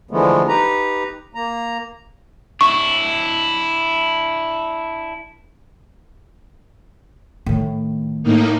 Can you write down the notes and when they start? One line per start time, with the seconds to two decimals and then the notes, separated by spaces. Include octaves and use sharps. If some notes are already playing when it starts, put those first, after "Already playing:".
0.11 D3 E3 F3 G#3 A3 B3
0.48 D#4 G4 B4 A#5
1.35 A#3 A#5
2.61 D4 E4 C#6
7.46 A2 D#3
8.23 A2 A#3 D#4